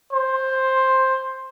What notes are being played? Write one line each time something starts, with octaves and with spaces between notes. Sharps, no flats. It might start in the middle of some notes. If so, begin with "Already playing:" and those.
C5